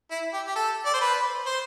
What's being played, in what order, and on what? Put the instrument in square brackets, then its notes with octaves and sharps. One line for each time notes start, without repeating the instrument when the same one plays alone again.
[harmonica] E4
G4
G4
A4
D5
C5
B4
C5